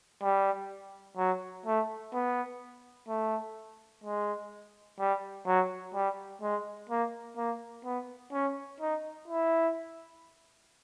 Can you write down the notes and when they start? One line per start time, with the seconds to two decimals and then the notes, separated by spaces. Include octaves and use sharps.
0.23 G3
1.17 F#3
1.66 A3
2.14 B3
3.09 A3
4.04 G#3
5.00 G3
5.47 F#3
5.95 G3
6.42 G#3
6.90 A#3
7.37 A#3
7.85 B3
8.33 C#4
8.80 D#4
9.28 E4